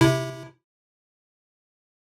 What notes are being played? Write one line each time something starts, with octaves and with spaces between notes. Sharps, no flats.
C3 E4